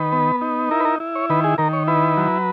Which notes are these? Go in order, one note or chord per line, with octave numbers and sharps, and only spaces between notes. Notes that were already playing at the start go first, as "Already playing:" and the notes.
Already playing: D#3 B4
B3
D#4
E4 A#4
B4
A#4
E4
C#5
D#3 B4
G#4
D#3 A#4
C#5
E4 B4
F#3